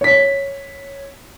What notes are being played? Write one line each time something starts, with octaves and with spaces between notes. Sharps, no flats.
C#5 B6